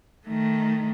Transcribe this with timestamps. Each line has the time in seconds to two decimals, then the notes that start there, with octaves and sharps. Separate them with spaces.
0.27 D#3 A3